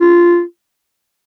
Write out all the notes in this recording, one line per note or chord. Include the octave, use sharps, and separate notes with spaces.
F4